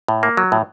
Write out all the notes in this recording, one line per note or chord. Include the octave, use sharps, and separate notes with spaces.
A2
A#3
F#3
A2